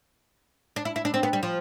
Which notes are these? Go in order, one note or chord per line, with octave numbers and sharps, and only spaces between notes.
D4
E4
E4
D4
C4
B3
G3
F3